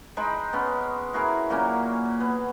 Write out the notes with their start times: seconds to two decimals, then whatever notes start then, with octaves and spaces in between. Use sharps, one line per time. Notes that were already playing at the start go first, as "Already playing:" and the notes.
0.17 G#3 D#4 G5 B5
0.53 B3 C#4
1.13 E4 F#4 G#4 A#4
1.50 A#2 F#3 A#3 C#4
2.20 B3